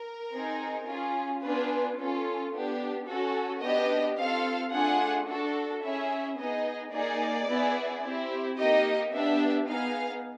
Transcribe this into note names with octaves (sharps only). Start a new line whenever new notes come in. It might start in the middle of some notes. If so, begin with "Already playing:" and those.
Already playing: A#4
C4 D#4 G#4
C#4 F4 G#4
B3 D4 F4 G#4 B4
C#4 F4 A4
B3 D4 G4
C#4 F#4 A4
B3 D4 G4 D#5
C4 F4 A4 F5
A3 D4 F4 G#4 F#5
D4 F#4 A4
C#4 E4 G#4 E5
B3 D#4 G#4 D#5
A#3 D#4 G#4 D5
B3 E4 G#4
C4 E4 G4
A#3 D#4 G4 D#5
B3 D4 G4 E5
B3 D#4 G#4 F5